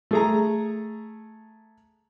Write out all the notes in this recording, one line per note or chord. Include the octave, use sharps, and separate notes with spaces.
A3 G#4 A#5